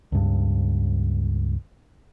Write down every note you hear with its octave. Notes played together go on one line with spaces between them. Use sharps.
C#2 G2